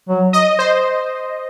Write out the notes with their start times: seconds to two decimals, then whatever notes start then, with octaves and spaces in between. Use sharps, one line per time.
0.09 F#3
0.33 D#5
0.59 C5